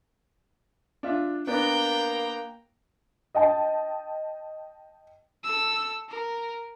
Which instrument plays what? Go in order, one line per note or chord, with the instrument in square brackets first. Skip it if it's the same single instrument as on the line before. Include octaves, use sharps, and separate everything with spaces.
[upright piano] D4 F4 E5
[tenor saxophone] A#3 [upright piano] B3 D4 [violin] G5 A#5
[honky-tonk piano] D#5 G5 A5
[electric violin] A4 E6
A#4